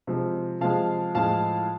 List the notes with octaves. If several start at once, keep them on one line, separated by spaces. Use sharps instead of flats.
C3 F3 G#3
C3 F3 G#3 F5 A5
A2 F3 G#3 F5 A5